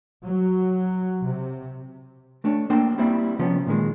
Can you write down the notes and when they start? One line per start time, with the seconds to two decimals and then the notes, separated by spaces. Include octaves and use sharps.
0.24 F#3
1.25 C3
2.44 A3 D4 C#5
2.70 A#3 D4 C5 G5
2.98 G3 A#3 C4 E4
3.39 C3 F3 B3 C#4
3.67 A#2 D#3 G#3